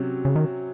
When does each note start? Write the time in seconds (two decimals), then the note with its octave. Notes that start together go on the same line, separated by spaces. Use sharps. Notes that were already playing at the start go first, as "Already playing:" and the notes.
Already playing: C3 F#3 C#4
0.25 C#3
0.36 D#3